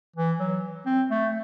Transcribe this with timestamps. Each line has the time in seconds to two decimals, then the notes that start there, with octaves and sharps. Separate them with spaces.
0.16 E3
0.40 F#3
0.86 C4
1.11 A3